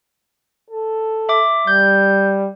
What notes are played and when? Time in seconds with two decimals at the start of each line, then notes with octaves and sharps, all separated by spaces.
0.70 A4
1.29 E5 D6
1.67 G3 G6